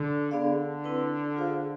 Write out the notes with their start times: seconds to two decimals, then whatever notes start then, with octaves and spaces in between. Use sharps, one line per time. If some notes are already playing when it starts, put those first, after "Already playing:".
Already playing: D3
0.31 D3 B3 D4 G#4 D5 F5
0.84 C4 E4 B4
1.36 F4 G#4 C5 F5